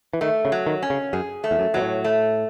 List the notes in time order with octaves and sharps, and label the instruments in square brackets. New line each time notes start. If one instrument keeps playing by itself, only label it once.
[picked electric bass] E3
[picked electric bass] D#3 [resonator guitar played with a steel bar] A3
[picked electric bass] C#3
[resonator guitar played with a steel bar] F#3
[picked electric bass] D#3
[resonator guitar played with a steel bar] C#4
[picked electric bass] C#3
[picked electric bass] F#2 [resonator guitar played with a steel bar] G#4
[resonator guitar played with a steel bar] A3
[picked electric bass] E2
F#2
[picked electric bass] B2 [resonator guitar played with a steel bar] F#3
[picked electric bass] A2
[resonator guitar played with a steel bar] A3